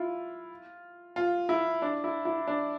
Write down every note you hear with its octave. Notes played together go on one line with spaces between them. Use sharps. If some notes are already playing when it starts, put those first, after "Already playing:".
Already playing: E4 F4
F4
E4
D4
E4
E4
D4